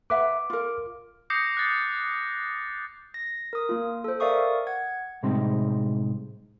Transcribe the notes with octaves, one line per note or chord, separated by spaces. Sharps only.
B4 E5 F#5 D6
F4 A#4
D6 D#6 G6 A#6 C7 C#7
F#6 A6
A#6
A#4 D#6
A#3 F4
A4 C5
A#4 D5 E5 F5 C#6 D#6
F#5 G#6
A2 C3 G3 G#3 C4 D#4